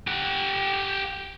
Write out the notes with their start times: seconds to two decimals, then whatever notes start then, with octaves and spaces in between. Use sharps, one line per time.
0.07 G4 F#5